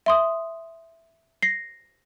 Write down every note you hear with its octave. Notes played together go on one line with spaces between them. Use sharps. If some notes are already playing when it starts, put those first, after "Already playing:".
E5 C6 D#6
A#6 C7